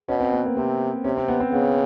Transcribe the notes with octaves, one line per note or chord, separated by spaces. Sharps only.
B2 C#4
C4
B3
A#3
C3 C4
C3 C#4
C4
B3
C4
C#3 B3